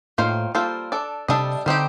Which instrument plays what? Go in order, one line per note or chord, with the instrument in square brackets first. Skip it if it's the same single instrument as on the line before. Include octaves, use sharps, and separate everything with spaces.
[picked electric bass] A2 [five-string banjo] D#3 A#3 F4 C5
[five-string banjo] G3 A#3 F4 A4 C5
D4 A4 D5
[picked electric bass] C3 [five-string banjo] G3 D4 A4 D#5
[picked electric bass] D3 [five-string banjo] G3 C4 D#4 G4